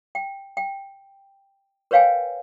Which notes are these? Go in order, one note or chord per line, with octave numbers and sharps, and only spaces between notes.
G5
G5
A#4 B4 C#5 F5 G5 G#5